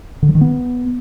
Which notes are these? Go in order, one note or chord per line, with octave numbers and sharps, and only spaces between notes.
D3
F#3
D#3
B3